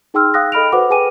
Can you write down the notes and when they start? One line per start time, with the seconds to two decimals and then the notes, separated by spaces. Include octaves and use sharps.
0.14 D#4 G#4 G5 C6 E6 F6
0.34 F5 G5 D#6 F#6 A#6
0.52 A4 D#5 B5 F6 D7 F7
0.72 F#4 B4 C5 F#5 D6
0.90 G#4 B4 G5 G#5 D6 D#7